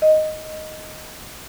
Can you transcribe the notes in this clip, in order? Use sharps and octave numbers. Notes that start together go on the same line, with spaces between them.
D#5